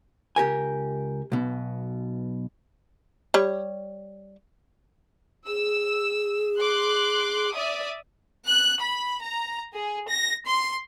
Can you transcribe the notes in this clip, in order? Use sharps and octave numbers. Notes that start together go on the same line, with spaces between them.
C#2 G4 A#4 G#5
B1 B2
G3 C#5
G#4 E6
C6 D6 F#6
D5 E5 D#6
F#6
B5
A#5
G#4
A#6
C6